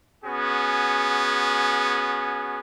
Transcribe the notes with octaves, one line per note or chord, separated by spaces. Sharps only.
B3 C#4 F#4 G#4